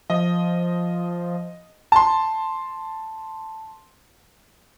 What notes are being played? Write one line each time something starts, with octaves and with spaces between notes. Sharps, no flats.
F3 D#5
A5 C6